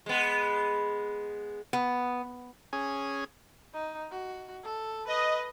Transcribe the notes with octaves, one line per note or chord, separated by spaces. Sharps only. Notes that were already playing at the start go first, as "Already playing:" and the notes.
G#3 B3
B3
C#4 G#4
D#4
F#4
A4
B4 D#5